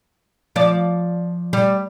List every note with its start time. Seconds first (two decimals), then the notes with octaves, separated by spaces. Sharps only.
0.56 F3 D5
1.53 G3